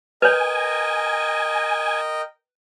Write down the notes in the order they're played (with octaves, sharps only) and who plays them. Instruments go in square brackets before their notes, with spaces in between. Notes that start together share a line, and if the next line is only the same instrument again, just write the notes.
[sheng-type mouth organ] A#4 D#5 G5 [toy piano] B4 C#5 [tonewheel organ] G#5